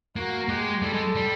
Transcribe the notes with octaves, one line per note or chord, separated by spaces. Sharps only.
A#3 F#4
G#3 G4
G3 A4
G#3
G3